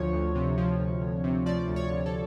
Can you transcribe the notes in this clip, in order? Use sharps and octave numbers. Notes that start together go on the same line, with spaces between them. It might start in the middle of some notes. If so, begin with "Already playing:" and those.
Already playing: D2 F3 C#5
D2
C3
F3
D2
D2
C3
F3 D5
D2
C#5
D2
A4